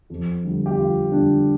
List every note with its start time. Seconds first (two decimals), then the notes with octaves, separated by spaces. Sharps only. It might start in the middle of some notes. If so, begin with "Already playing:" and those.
0.10 F2
0.44 D3 G3
0.66 G4
0.78 F2 F4
1.12 D3 G3 D4